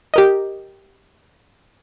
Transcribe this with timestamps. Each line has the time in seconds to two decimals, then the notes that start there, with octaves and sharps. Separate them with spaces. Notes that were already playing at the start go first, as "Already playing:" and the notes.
0.14 G4 A#4 D#5